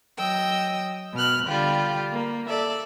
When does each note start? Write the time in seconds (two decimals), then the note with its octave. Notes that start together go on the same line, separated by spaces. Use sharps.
0.17 F#3 D#5 G5 E6
1.14 B2 F6 F#6
1.47 D3 G3 F4 G4
2.12 A#3
2.49 A4 D5 E5